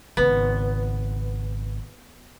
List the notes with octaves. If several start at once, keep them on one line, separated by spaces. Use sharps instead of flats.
G#1 C#3 B3